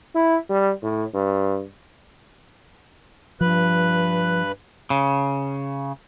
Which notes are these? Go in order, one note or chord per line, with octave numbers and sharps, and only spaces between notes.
E4
G3
A2
G2
G2 F3 B4 F#6
C#3